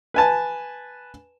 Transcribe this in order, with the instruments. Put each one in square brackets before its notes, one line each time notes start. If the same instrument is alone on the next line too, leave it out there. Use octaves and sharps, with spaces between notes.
[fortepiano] B4 G#5 A5